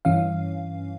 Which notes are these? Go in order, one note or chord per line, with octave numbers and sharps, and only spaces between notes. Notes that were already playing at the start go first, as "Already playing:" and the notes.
G2 E3 C#4 F5